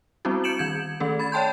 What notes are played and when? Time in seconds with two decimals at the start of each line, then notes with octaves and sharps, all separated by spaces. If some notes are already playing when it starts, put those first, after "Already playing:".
0.25 G3 B3 C4 D4 E4 F#4
0.44 G6 C#7 D7 E7 F#7
0.59 D#3 G6 G#6
1.00 D#3 A3 C#4 A4
1.19 B5 G#6 A6
1.32 C#5 D5 G5 A5 C6 G6